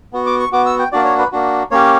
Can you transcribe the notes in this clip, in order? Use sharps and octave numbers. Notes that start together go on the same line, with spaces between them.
B3 F#4
D6
C#6
B3 F#4 D6
E6
G5
A#3 D4 F#4 D5
C#5
B4
A#3 D4 F#4
A#3 C#4 G4 C#5